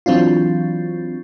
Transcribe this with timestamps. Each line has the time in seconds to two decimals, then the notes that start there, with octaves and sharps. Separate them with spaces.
0.06 E3 F#3 C4 D4 F4